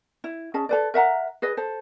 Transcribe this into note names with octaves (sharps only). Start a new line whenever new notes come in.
E4
C#4 G#4 D#5 A5
A4 B4 D5
A#4 E5 F#5 A#5
G#4 B4 D#5
A4 C5